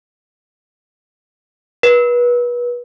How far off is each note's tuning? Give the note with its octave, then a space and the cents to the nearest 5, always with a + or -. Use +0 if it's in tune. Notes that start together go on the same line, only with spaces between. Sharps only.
B4 -30